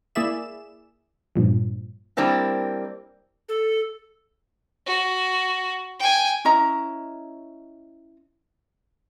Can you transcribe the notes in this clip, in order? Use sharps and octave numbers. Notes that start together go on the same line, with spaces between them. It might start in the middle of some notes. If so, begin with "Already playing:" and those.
A#3 E4 G#4 D5 E5 E7
G2 A#2 F3
G3 A#3 C4 D4 E4
A4
F#4
G5 G#5
C#4 E4 D#5 A#5